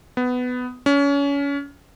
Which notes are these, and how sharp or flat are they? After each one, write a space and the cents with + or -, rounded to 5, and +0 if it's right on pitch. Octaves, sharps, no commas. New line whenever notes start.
B3 +15
C#4 +30